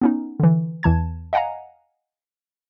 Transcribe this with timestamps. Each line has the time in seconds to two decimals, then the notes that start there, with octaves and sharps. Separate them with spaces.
0.01 B3 C#4 D#4
0.40 D3 E3
0.83 E2 E3 A5 G#6
1.33 D#5 F5 F#5 G#5 A#5